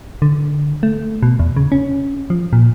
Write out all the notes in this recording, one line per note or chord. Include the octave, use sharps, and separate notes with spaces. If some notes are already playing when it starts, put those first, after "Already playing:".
D3
A3
B2
E2
C#3
C#4
F3
A#2